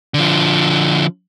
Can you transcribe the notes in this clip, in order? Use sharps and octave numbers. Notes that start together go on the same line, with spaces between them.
D3 F3